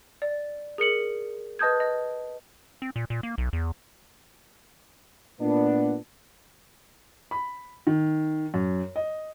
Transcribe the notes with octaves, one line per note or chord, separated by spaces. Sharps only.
D5
G#4 A#4 C#7 F#7
B4 D#5 A5 D#6 G6 G#6
D#5
C4
A#2
A#2
A#3
B1
E2
A#2 B3 D4
B5
D#3
F#2
D#5